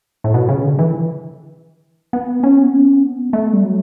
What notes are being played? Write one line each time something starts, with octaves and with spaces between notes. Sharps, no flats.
A2
B2
C#3
D3
E3
B3
C#4
B3
C#4
B3
A3
G3
F#3